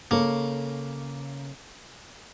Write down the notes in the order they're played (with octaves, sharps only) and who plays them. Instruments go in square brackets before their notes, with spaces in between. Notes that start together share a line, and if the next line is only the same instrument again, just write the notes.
[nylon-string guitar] C#3 A4 C#5 [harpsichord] A#3